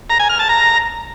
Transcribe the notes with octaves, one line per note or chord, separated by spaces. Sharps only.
A#5
G#5
F6
A5
A#5